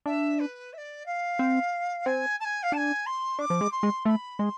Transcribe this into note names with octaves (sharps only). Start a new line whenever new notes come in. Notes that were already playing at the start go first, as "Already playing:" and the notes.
D4 E5
B4
E5
D5
F5
C4
C4 G#5
A5
G#5
F5
D4 A5
G#5
C6
D4 D6
F3
G#3
C6
G#3
A3 B5 C6
G#3 C6